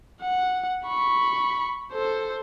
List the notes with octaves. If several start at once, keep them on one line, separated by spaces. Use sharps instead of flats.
F#5
B5 C#6
A4 C5